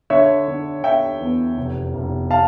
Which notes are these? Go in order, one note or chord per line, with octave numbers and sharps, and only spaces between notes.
D3 C#5 E5
D3
D3 E5 G5
E2
F1
F1
F5 A5